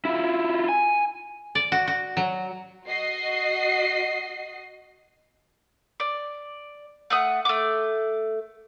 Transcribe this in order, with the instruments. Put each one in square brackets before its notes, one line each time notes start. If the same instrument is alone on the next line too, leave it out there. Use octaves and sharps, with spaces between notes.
[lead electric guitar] E4 F4
G#5
[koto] D5
F#4
F#4
F#3
[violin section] F#4 D#5 C7
[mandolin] D5
A3 F#5 D#6
A3 D6